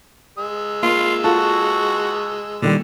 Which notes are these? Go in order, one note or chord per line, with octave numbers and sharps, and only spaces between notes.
G#3 E6
A#3 F4
F4 F#4 A4 A5
A#2 D3 D#3 G3